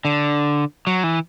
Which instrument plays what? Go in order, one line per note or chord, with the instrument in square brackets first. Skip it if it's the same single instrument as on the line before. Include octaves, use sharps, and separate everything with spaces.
[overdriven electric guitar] D3
F#3
E3